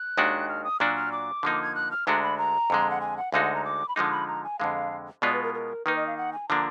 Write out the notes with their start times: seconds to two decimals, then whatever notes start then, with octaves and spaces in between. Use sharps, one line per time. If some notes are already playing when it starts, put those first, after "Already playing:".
Already playing: F#6
0.17 D#2 D#3 G#3 D4 F#4
0.49 F6
0.64 D#6
0.80 A#2 F#3 D4 F#4 F6
0.96 F6
1.12 D6
1.43 D3 F3 A#3 D#4
1.62 G#6
1.75 F#6
1.91 F6
2.07 D2 D3 G#3 D4 F#4 A#5
2.23 B5
2.38 A#5
2.70 F2 D3 G#3
2.90 F#5
3.01 G#5
3.17 F#5
3.32 D2 D3 G#3 D#4 F#4 F5
3.44 F#5
3.54 A#5
3.64 D6
3.89 B5
3.96 D3 F3 G#3 D#4 D6
4.12 B5
4.27 A#5
4.44 G#5
4.59 F2 D3 G#3 F5
5.22 B2 G#3 B3 F4 D5
5.33 B4
5.43 A#4
5.54 A#4
5.86 D#3 A#3 D#4 B4
5.96 D#5
6.07 F5
6.17 F#5
6.33 G#5
6.48 D3 F3 A#3 D4 A#5